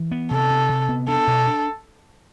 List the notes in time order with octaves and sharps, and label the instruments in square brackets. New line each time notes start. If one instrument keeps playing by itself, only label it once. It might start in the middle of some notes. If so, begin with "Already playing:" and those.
Already playing: [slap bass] E3
B3
[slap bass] C3 [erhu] A4
[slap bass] C3
C3
B3
[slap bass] D4 [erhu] A4
[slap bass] B2
D4